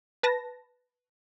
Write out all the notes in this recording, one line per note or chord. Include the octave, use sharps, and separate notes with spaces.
B4 A5 A#6